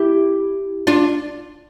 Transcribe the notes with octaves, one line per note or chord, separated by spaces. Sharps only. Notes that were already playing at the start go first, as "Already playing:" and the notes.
Already playing: E4 G4
D4 F4